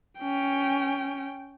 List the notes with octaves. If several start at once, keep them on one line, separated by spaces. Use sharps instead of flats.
C#4 G5